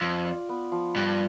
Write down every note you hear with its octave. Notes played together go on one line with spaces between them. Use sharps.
F2 F4
D5
B3
F3
G2 G4